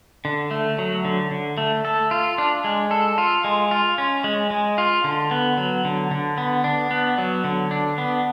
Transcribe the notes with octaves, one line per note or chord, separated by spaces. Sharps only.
D3
A3
F#3
D3
D3
A3
A4
F4
D4
G#3
A4
F4
G#3
F4
C#4
G#3
G#3
F4
D3
B3
F#3
D3
D3
B3
D4
B3
F#3
D3
D4
B3